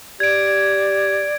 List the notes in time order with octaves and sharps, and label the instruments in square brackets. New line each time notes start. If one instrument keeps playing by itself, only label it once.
[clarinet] G4 [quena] D5 [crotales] G#6 D7